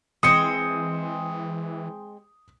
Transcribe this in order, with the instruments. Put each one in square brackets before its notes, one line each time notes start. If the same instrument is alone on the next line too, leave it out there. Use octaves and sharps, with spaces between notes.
[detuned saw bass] E3 [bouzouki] G#3 C4 [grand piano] D#6 C#7